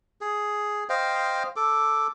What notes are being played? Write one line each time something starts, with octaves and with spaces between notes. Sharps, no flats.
G#4
C5 D#5 F5 G5
A4 D6